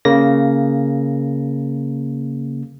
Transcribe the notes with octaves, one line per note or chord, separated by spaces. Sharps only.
C#3 A#3 A#6